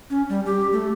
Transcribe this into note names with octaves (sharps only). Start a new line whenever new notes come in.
C#4
G3
G4
A3